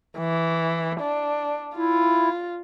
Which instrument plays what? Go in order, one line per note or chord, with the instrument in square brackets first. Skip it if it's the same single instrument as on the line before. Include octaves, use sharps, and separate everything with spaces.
[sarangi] E3
D4
[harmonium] E4 [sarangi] F4